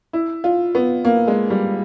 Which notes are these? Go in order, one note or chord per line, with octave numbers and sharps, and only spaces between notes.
E4
F4
B3
A#3
G#3
G3